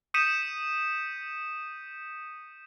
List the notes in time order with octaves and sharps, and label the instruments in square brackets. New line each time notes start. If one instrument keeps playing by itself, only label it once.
[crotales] D#6 G6 B6 C#7 D#7 E7